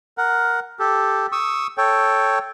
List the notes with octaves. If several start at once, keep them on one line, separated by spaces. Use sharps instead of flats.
A#4 F#5
G4 A4
C#6 D#6 E6
A4 C#5 G5